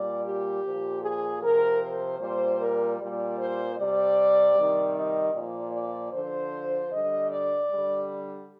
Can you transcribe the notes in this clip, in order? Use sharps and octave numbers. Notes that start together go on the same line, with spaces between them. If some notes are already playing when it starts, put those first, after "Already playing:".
Already playing: A#2 G3 D5
G4
A#2 F3
G#4
C3 F3 A#4
C5
A#2 G3 C5
A#4
A#2 G3 D5
C5
C3 G3 D5
C3 D#3 G3
D#5
A#2 F3 D5
D5
D3 F3 C5
D3 G3 D#5
D5
D3 G3